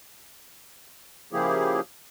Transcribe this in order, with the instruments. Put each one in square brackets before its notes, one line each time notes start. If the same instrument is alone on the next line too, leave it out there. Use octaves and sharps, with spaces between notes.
[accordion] C#3 F3 A#3 E4 G4 G#4